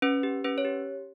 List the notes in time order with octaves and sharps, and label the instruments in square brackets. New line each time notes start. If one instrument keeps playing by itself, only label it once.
[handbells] C#4 B4
G4
C#4 B4
C#5
G4